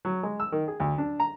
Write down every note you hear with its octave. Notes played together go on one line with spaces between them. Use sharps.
F#3
G#3
E6
D#3
G#4
D2
D4
A#5